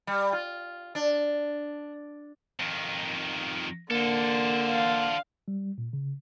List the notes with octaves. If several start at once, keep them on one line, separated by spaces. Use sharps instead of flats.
G3
F4
D4
F2 D#3
D3 A#3 A4 C5
F5
G3
A#2
C#3